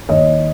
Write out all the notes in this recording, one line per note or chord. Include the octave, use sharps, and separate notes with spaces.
D#2 C#5 D#5